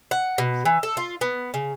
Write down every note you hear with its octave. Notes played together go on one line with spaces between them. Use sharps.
F#5
B2
E3
A4
F4
B3
C#3